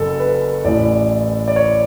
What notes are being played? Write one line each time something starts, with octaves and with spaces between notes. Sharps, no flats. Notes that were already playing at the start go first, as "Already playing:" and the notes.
Already playing: F#1 F#2 A4
B4
A1 A2 E3 D5
D5
C#5